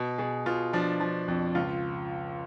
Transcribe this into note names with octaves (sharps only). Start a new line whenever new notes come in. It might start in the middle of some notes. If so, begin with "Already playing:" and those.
Already playing: B2
B2 G#4
B2 F4
F3 D4
F3
F2
C#2 F4